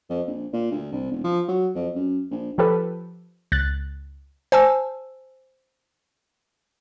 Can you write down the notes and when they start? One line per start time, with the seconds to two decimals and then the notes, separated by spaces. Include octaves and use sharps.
0.10 F2
0.27 A#1
0.53 A#2
0.71 D2
0.92 C2
1.11 E1
1.24 F3
1.48 F#3
1.75 F2
1.95 F#2
2.31 A#1
2.58 F3 G4 A4 B4
3.52 C#2 F#6 A6
4.52 C5 G#5 A5 E6